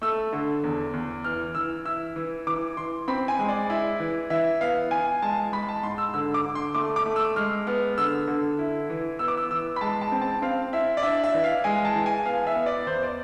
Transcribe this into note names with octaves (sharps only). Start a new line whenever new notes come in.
A3 E6
D3
E2
E2
E3 F6
E3 E6
E4 E6
E3
E3 D6
E3 C6
C4 B5
G#5
G#3
D5
E4
E3
E3 E5
B3 F5
E3 G#5
G#3 A5
G#3 B5
A5
G#2 C6
E6
D3 E6
D6
D3
C6
A3 D6
D6
A3
E6
G#3 F6
B3 F6
D3 E6
D3
E4
E3
B3 E6
D6
E6
E3 E6
B5
G#3 A5
A5
C4
A5
C4 F5
E4 E5
D5
D4 E5
E5
E3
F5
G#3 G#5
A5
E3
G#5
B3 F5
E5
B3
D5
E2 C5
D5